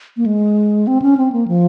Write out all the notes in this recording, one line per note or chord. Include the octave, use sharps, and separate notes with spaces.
A#3
G#3
C4
C#4
C4
A#3
F3